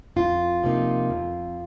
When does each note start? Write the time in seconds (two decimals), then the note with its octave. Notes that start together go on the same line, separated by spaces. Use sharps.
0.16 F2 F4
0.63 C3 F3 A#3 D#4
1.10 F2